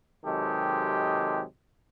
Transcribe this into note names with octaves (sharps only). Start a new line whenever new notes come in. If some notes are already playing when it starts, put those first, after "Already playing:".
C3 D#3 F#3 G#3 G4 A4